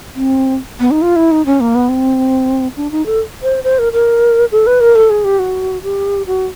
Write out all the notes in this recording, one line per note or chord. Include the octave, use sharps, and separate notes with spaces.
C4
B3
D#4
F4
E4
D#4
C#4
A#3
B3
C4
D4
D#4
A4
C5
C5
A#4
A#4
A4
B4
A#4
A4
G#4
G4
F#4
G4
F#4